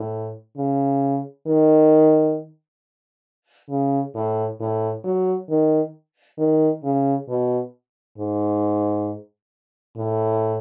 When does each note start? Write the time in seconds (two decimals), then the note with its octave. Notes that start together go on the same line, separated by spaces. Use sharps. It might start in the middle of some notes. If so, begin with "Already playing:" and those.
Already playing: A2
0.57 C#3
1.47 D#3
3.70 C#3
4.15 A2
4.60 A2
5.05 F#3
5.50 D#3
6.38 D#3
6.84 C#3
7.28 B2
8.18 G#2
9.97 A2